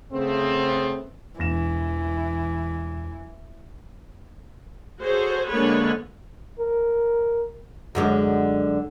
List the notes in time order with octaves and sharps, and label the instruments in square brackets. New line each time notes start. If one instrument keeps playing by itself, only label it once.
[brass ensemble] C#3 A3 B3 C4
[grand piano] E1 A#6 E7 [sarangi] E3
[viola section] F#4 G#4 A4 C5 C#5
D3 G#3 A#3 B3 B4 C#5
[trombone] A#4
[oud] F#2 D3 G#3